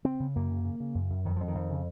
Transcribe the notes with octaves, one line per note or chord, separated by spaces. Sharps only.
C#3 C4
C#3
F#2 A#3
C#3
C#3
C#3
F#2
F#2
F2 D#3
F2 F3
D#3
F2
C#3